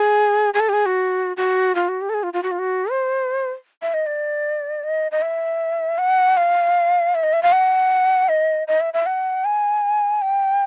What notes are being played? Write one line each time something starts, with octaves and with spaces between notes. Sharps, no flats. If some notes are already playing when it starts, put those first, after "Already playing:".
Already playing: G#4
G#4
A4
G4
G#4
F#4
F#4
F4
F#4
G4
A4
G#4
F4
F4
F#4
F4
F#4
C5
E5
D#5
D5
D#5
D#5
E5
F#5
F5
E5
D#5
E5
F5
F#5
D#5
D#5
E5
E5
F#5
G#5
G5